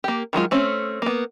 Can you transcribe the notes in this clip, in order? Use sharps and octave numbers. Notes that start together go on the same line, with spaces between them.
A#3 G4
D#3 F#3 G#3 F4
A3 C4 C#4
A#3 B3